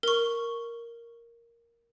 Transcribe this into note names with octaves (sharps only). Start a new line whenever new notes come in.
A#4 C#6